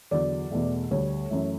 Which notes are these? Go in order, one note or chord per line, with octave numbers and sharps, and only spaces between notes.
E2 D3 F#3 D5
E2 B2 A3
D2 D3 G3 C#5
F#2 E3 A3